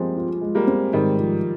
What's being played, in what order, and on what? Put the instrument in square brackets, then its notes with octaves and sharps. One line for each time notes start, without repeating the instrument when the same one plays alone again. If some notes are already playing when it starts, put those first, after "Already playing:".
Already playing: [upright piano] F3 G3 G#3 A#3 [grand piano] C4
[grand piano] F4
G#3
[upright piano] G3 A#3
[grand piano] C4
[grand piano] G#2 [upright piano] D#3 G3
[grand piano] F3